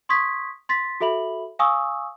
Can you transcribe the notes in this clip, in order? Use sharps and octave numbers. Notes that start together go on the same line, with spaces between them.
C6 C#6 D#6 G#6 B6
C6 A6 B6
F#4 A4 E5 B5 F#7
F5 G#5 C#6 D#6 E6